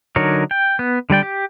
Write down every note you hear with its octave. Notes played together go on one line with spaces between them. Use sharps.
D3 F#3 D#4 A#4 C#5
G5
B3
D3 G3 D5 G5
G4